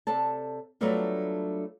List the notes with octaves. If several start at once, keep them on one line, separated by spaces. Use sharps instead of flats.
C3 A4 D5 A5
F#3 G3 A3 B3 D4 F4